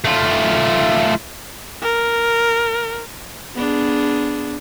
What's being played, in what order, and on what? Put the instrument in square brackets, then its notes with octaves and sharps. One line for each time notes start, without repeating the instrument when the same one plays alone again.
[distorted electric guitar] A3 F4
[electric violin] A#4
[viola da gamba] B3 D4 G#4